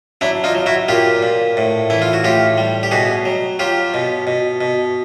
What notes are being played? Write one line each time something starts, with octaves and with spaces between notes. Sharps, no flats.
F#3 D4 E4
D#4 F4
F#3
E4 F#4
A#2 F4 G4
A#2
A2
E3 E4
F4
F#4
A2 F4 G4
G3
G4
B2 F#4 G#4
F#3
F#3 F4 G4
B2
B2
B2